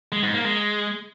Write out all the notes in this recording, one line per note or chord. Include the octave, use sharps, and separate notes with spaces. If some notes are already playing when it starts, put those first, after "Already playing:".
G#3
G#2
A#3
G#3